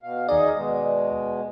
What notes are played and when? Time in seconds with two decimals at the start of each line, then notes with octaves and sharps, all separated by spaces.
0.03 B2 F5
0.29 D#2 D#4 G#4 D5 D#5
0.56 B2 G#3